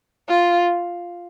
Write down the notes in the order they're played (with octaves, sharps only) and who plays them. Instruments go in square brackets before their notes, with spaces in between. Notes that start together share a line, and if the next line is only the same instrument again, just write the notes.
[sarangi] F4